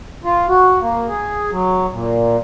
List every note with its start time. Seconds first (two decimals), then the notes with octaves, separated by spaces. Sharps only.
0.24 F4
0.49 F#4
0.81 A#3
1.08 G#4
1.51 F#3
1.92 A#2